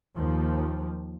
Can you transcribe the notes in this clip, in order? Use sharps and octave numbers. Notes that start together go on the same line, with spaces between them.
D#2 F3